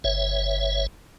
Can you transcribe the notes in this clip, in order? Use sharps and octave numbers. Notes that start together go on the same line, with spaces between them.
G1 C#5 E5